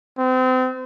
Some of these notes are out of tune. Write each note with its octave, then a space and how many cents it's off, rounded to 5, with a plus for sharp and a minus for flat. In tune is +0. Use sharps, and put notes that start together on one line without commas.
C4 -35